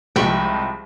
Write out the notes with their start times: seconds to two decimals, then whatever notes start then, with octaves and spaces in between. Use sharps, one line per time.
0.16 C2 F3 G#3 G5 B5 C#6